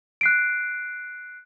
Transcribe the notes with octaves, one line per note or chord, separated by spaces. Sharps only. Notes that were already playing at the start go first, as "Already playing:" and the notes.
F#6 C7 D7